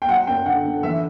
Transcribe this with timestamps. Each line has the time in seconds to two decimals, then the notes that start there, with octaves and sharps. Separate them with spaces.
0.02 G5
0.08 F#3 F#5
0.27 F#2 G5
0.46 D3 F#5
0.64 D3
0.83 E3 E5